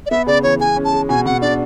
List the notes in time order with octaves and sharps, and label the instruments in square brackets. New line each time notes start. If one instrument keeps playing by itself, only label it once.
[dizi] D5
[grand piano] B3 [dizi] E5
[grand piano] C#3 [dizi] D5
[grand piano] E3 [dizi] C#5
[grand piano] G#3 [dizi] G#5
[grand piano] C#4
[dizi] A5
[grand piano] G#3
[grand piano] B2 [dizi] G#5
[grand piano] B2 [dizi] F#5
[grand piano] D4 [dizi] D5